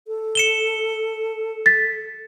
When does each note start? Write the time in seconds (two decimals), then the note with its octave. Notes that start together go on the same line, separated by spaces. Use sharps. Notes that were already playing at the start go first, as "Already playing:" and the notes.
0.08 A4
0.35 C#7 E7 G7
1.66 A6 B6